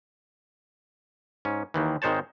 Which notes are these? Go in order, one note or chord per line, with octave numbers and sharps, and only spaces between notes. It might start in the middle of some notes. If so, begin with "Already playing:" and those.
G#2 C#4
D#2 D#3 E3
G#1 D#3 G#3 C5 C#5 A5